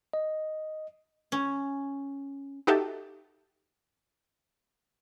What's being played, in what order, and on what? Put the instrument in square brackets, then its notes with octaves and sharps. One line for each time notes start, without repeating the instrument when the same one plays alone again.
[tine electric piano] D#5
[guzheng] C#4
[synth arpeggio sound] D#4 F#4 G4 A4 E5 A5